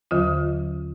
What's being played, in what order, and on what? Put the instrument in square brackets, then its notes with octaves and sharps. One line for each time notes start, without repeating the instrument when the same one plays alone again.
[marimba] D#2 D3 F#3 F4